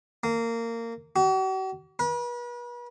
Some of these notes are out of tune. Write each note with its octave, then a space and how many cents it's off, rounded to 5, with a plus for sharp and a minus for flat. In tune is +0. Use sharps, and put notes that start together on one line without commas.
A#3 -20
F#4 +45
B4 -40